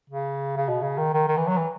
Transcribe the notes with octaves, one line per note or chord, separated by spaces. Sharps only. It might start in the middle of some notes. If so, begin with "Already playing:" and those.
C#3
C#3
B2
C#3
D#3
D#3
D#3
E3
F#3
E3